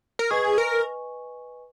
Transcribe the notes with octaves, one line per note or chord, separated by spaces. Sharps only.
A#4
G#4 B4 D#5 G#5 C#6
A#4